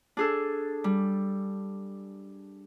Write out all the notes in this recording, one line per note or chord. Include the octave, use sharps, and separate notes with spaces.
D4 G#4 A4
G3